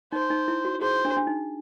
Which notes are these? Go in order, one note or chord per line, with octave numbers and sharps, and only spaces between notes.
D#4 C5
D#4
E4
F#4
G#4 C5
D4
D4
D#4